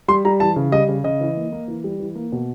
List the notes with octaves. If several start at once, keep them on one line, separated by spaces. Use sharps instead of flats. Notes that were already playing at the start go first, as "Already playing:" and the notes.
G3 C6
G3 A#5
E3 A5
C#3
G3 D#5
C#3
C#3 D#5
E3
A#3
A#3
E3
G3
E3
A#3
B2